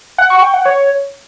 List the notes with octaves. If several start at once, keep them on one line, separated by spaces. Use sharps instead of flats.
F#5
C#6
G5
F#5
C#5